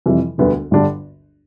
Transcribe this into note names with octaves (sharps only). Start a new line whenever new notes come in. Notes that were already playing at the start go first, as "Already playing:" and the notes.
F2 C3 E3 G3
E1 D2 D3 G3 B3
G1 G2 D3 G3 D4